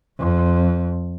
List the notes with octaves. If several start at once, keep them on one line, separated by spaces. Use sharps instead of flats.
F2